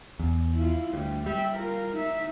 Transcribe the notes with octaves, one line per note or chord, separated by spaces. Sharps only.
E2
E4 F4
D2 G3
G3 E5 G5
F4 A#4
D#4 E5